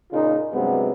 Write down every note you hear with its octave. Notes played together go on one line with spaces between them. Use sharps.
A#2 C#3 D#4 F4
G2 C3 F#3 G#3 B3